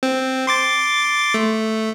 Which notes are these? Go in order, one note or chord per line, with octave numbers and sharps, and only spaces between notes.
C4
C6 D6 A6
A3